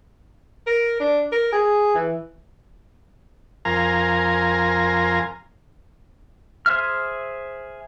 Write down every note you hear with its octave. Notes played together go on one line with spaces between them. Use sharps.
A#4
D4
A#4
G#4
E3
F2 A#4 F5 G#5 A#5 C6
G#4 C5 E5 F6